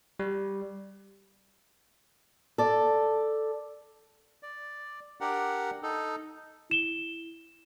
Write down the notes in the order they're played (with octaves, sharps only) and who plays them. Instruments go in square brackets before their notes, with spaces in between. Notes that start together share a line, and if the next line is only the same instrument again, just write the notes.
[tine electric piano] G3
[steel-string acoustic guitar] A4 D5
[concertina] D5
D4 G4 A#4 F#5
D#4 A4
[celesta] E4 E7 G7